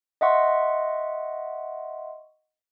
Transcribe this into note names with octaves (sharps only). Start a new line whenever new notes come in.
D#5 E5 F#5 C6 C#6